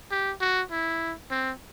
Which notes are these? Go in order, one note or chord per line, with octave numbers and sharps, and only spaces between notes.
G4
F#4
E4
C4